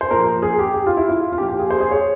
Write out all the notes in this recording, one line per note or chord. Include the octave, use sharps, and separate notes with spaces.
C5
A#2 F3 A#4
G#4
G4
G4
F4
E4
F4
F4
A#2 F3 G4
G4
G#4
C5
G#4
C#5